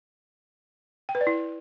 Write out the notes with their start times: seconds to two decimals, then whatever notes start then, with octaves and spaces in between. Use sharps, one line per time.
1.09 G5
1.15 B4
1.21 D5
1.27 E4